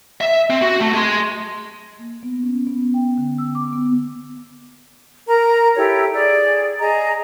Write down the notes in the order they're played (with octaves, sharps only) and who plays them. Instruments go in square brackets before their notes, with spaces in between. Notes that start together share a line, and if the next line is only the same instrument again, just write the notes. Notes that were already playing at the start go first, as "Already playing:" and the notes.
[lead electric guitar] E5
C4
F#4
A3
G#4 C6
[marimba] A#3
B3
C#4
B3
G5
D3
E6
D6
B3
[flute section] A#4 A#5
E4 G4 A4 C#5
G#4 D5
G#4 D#5 A#5